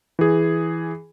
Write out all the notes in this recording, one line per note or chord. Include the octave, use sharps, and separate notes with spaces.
E3 G#4